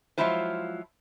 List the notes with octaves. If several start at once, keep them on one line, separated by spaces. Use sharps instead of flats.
F3 F#3 G#3 E4 F4 C5